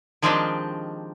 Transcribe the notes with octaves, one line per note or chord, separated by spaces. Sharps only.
D#3 F3 G#3 C4 D4 G4